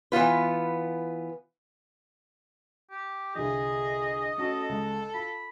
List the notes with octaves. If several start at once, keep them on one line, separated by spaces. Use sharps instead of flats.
E3 B3 F4 B4
G4
C2 D3 F3 G#4 D#5
A3 C#4 F#4 A4
C#2 G#3
F4 B5